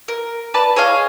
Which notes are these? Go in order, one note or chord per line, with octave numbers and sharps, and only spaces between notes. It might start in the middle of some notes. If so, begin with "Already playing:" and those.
A#4
B4 D5 A5
G#4 C#5 D#5 F5